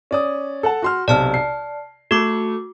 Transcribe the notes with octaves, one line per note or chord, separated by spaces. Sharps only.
C#4 D5 D#6
A4 F#5 A5
F#4 C6 F6
B1 C3 D5 A5 F6
C7
A3 F#4 D6